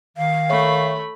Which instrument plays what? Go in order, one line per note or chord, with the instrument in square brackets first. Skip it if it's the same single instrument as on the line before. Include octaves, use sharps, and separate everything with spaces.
[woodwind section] D#3 [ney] F5
[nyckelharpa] A3 B5 [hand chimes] C#5 E5 C#6